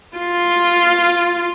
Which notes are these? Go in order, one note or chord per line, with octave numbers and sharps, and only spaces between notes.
F4